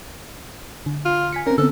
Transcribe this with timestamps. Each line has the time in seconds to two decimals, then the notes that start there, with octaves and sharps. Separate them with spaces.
0.86 D3
1.05 F4
1.33 G#5 B6 C#7
1.47 C4 C#4 A#4
1.58 D3 B3 C4 A4